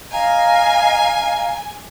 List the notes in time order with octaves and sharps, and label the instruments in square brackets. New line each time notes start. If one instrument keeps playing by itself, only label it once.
[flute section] D#5 F5 A#5 [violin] G#5